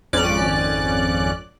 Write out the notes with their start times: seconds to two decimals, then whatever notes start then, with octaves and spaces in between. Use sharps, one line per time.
0.13 G#1 F2 C#4 D5 F#6